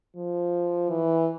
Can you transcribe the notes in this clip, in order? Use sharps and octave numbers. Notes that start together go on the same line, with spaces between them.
F3
E3